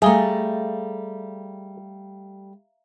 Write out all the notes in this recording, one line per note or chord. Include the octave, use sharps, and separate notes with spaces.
G3 A3 G#4 E5 F5 A#5